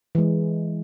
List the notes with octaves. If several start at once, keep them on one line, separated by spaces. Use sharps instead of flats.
E3 G#3